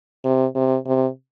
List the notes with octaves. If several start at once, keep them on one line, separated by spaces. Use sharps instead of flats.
C3
C3
C3